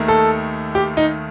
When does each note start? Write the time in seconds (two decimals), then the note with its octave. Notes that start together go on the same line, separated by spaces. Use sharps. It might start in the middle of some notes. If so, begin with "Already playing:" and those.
Already playing: D#2 D#3 A3
0.08 A4
0.75 G4
0.97 D#4